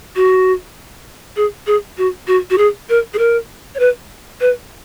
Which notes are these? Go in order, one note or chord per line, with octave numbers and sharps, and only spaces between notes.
F#4
G#4
G#4
F#4
F#4
F#4
G#4
A#4
G#4
A#4
C#5
B4
B4